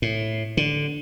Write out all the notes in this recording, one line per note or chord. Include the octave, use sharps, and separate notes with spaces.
A2
D3